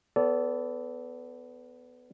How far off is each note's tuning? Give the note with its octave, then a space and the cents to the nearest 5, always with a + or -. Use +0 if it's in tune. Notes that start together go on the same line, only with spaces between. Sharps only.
B3 +15 A4 +0 D5 -30